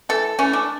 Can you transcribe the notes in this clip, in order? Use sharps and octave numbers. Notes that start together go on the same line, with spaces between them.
E3 A3 A4
E3 A3 C#4
D4